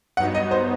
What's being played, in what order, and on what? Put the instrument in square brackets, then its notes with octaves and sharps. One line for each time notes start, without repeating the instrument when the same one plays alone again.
[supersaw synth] G2 F#3 B3 D#4 [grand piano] F#5
[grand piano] D#5
C5